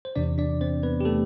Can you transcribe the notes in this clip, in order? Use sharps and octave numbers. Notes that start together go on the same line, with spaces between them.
C5
E2 C3 E3 D4 D5
D4 D5
C4 C5
B3 B4
G4
A3 A4